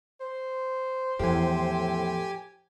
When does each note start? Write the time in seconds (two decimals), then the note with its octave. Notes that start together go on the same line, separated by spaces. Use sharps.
0.20 C5
1.19 E2 A2 F3 G4 G#5